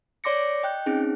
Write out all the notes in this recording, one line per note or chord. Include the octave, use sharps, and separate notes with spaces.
C#5 D5 C6 D6 A#6 C#7
D#5 G5 F#6 G6
C4 C#4 D#4 G#4